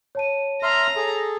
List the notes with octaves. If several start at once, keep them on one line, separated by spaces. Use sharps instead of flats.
C#5 A5 D#7
E5 A#5 C6 F6
G#4 A4